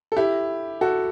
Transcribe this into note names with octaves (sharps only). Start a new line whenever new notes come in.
A4
E4 G4
F#4 A4